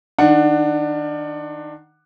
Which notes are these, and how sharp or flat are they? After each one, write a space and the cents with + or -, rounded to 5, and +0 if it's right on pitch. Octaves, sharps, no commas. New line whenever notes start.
D#3 +0 D4 +20 F#5 +0